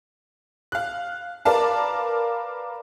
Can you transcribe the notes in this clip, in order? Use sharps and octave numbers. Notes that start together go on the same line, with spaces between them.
F5 F#6
A#4 B4 D5 F5 A5